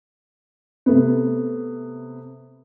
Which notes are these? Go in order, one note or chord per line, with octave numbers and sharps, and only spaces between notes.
C3 A3 B3